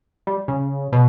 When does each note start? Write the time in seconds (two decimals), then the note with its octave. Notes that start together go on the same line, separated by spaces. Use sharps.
0.27 G3
0.48 C#3
0.92 B2